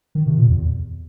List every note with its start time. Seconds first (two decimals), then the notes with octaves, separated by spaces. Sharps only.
0.15 D#3
0.26 C3
0.38 A#2
0.49 E2